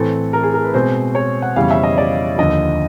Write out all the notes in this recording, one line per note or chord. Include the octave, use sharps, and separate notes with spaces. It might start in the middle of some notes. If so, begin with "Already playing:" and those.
Already playing: A2 E3 A3 C4 A4
A#4
G#4
A#4
B4
B2 G#3 C4 C5
C#5
F#5
F2 C#3 E3 G3 B3 F5
E5
D#5
D5
D#2 D3 F3 D#5